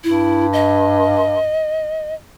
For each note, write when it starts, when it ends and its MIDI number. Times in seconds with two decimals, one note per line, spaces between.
0.04 1.62 43
0.04 0.46 64
0.53 2.14 75